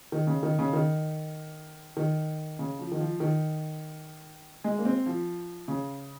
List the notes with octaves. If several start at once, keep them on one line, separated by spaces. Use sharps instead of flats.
D#3
C#3
D#3
C#3
D#3
D#3
C#3
F3
D#3
F3
D#3
G#3
A#3
C4
F3
C#3